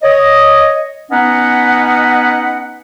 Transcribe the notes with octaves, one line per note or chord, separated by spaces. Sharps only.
C#5 D#5
B3 C#4 D#4 B4 D#5 F#5